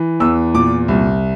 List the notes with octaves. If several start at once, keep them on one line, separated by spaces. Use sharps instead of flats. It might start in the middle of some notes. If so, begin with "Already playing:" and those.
Already playing: E3
E2 E6
A#2 D6
C2